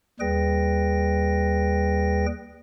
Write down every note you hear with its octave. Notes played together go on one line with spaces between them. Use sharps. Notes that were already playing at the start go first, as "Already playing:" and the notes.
D#2 G3 G#4 B4 G5 A#6